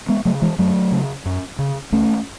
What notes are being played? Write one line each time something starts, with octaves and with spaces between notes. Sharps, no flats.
G#3 B3
C#3 F#3 A3
E3 G#3
F#2 F#3 A3
C#3
F#2
C#3
C#2 A3 C#4